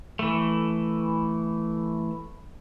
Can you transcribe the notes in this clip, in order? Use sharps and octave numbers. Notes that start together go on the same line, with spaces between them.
E3 A3